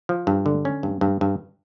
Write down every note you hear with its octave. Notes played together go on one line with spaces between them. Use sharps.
F3
G2
D3
C#4
G2
G2
G2